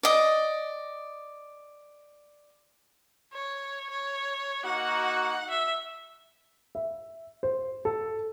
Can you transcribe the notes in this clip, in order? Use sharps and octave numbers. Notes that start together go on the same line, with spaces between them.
D5 D#5
C#5
C#5
A#3 D#4 F#4 F#5
E5
E5
C5
A4